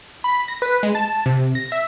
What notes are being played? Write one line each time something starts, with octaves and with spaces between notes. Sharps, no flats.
B5
A#6
B4
G#3
A5
C3
A#6
E5